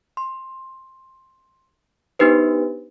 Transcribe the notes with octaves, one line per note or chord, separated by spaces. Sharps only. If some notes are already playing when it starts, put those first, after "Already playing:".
C6
B3 D4 D#4 G4 B4 C5